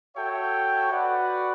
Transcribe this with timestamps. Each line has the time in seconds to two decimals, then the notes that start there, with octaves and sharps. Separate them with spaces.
0.16 F#4 A4 C#5 E5 G5
0.90 F#4 B4 D5 F#5